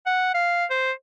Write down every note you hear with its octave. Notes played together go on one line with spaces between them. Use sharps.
F#5
F5
C5